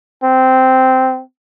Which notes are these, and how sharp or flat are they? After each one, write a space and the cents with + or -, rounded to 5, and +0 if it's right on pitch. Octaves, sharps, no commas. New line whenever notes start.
C4 -10